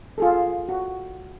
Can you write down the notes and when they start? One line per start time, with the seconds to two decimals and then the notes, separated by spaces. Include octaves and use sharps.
0.18 F4 G#4 A4
0.69 F#4